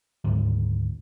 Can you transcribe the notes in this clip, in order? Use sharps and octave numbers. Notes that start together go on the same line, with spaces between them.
D2 G#2 D3 D#3